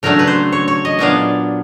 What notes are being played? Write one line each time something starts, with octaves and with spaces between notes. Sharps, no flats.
C#3 F#3 A3 D4 A#4
B4
C5
C#5
C#5
D#5
A#2 F#3 B3 D4 F5